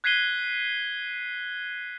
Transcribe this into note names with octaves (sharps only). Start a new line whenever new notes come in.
F#6 G#6 B6 C7 D#7 G7